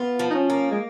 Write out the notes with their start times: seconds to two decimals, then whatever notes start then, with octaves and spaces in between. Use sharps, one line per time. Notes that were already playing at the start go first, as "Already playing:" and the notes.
Already playing: B3 F4
0.19 F3
0.31 D#4
0.35 C#4
0.50 A#3
0.71 G#3